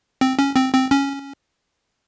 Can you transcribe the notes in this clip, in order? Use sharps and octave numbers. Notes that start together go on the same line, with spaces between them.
C4
C#4
C4
C4
C#4